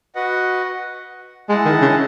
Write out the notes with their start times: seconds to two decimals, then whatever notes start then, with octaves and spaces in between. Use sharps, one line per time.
0.15 F#4 B4 D#5 F#5
1.49 G#3 E4 G#4 D#5 F#5 A5
1.65 D#3
1.82 C#3